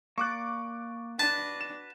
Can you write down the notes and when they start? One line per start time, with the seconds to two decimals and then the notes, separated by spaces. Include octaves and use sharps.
0.18 A#3 D5 C#6 D6 F#6
1.19 D4 F#4 B4 A5
1.61 E7